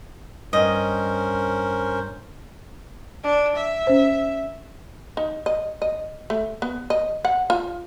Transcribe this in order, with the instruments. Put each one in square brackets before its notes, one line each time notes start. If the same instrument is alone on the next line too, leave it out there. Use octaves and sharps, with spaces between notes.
[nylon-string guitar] G2 [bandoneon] C#4 A#4 C5 [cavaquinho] D#5
[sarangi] D4
E5
[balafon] C#4 C5
[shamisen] D#4
D#5
D#5
A3
B3
D#5
F#5
F4